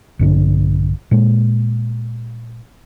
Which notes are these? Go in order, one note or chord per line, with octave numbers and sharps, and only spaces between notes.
A#1 G2 D3
A#2 G#3